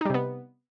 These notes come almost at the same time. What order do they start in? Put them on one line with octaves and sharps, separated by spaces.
D#4 G3 C3 B3